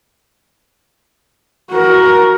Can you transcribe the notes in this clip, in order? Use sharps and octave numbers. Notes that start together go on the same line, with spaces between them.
F#4 A#4